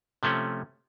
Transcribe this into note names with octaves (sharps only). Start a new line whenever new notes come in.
C3 F3 A3 C#4